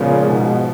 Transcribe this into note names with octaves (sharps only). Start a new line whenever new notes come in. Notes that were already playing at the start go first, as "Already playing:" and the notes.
Already playing: A#2 C#3 F3 G#3 B3 F4
G#2 B2